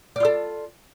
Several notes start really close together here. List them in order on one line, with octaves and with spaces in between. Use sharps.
D5 F4 A4